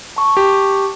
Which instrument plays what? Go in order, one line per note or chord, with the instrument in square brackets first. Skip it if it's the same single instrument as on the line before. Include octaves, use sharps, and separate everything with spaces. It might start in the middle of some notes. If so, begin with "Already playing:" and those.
[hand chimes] A5 C#6
[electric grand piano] G4